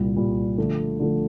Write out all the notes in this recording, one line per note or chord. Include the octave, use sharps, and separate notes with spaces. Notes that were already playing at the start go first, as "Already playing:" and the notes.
Already playing: C2 A#2 G3
C2 A#2 G3
D3 F3 A3
D3 F3 A3